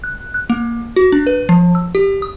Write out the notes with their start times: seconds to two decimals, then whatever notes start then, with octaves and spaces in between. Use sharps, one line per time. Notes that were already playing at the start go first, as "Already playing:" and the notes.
0.04 F#6
0.34 F#6
0.50 A#3
0.96 F#4
1.12 D4
1.27 B4
1.49 F3
1.75 E6
1.95 G4
2.22 D#6